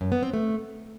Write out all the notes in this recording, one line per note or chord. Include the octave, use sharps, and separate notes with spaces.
F#2
B3
C4
A3